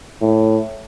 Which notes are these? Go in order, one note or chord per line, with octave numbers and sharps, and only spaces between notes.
A2